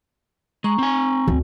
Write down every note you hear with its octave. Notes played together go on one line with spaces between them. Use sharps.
G#3 A#5 C#6
C4 G#5
D2